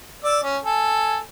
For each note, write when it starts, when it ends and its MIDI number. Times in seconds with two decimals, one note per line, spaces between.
0.24 0.38 74
0.24 0.38 88
0.43 0.58 61
0.65 1.19 69
0.65 1.19 80